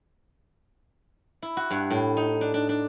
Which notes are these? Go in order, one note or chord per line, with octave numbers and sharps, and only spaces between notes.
E4
F#4
G2
A2
D#4
D4
D4
D4